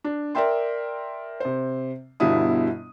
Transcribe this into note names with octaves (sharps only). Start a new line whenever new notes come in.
D4
A#4 D5 E5 G5 C6
C3 C5
G1 B2 D3 G3 E4 D#6